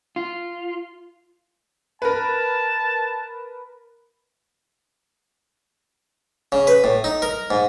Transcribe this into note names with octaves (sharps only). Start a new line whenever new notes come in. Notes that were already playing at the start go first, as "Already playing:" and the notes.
F4
A#4 B4 A5
C#3
B4
A2
D#4
A#4
G#2